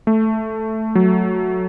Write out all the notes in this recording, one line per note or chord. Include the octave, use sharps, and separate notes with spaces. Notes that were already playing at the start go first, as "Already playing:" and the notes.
A3
F#3